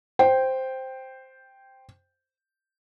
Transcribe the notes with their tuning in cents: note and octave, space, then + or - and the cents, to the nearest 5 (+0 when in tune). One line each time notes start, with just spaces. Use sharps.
C5 +0 G5 +0